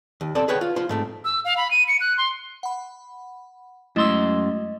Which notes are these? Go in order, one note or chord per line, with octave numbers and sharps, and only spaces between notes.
D#2
C4 A4 C5 D5
G#4 B4 C#5 F#5 G5
F4
F4 C5
G#2 A3 C4
E6
F5
B5
D#7
C#7
F#6
C6
F#5 B5
F#2 G#3 A3 E4 D#5 C6 E6